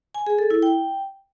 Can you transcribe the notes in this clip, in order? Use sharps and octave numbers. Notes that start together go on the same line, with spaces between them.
G#5
G#4
A4
E4
G5